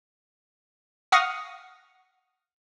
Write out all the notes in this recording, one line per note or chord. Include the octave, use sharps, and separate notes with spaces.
F5 F#5 C#6 D#6 F6 A#6